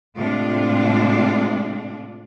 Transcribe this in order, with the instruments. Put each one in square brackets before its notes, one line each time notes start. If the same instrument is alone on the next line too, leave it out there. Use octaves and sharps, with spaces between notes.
[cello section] A2 C3 G#3 D4 F4